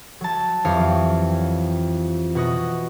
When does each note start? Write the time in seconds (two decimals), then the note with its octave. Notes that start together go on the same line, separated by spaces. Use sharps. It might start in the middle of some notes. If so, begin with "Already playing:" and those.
0.21 F#3 A5
0.64 F2 E3 G3 C#5 F5
2.35 B2 F#4 D#5